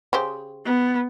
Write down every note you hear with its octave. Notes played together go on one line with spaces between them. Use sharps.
C#3 G4 C5
B3